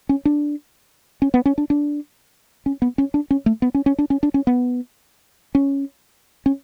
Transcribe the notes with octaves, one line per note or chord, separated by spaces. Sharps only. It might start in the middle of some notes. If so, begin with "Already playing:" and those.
C#4
D4
C#4
B3
C#4
D4
D4
C#4
B3
C#4
D4
C#4
A3
B3
C#4
C#4
D4
C#4
D4
C#4
B3
C#4
C#4